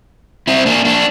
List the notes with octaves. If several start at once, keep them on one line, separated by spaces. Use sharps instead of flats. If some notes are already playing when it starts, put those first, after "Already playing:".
C4 E4
A#3 D4
A#3 D4